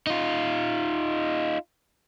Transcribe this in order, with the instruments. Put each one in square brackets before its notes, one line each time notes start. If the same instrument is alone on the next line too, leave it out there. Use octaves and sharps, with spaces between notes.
[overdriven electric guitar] D#4 F4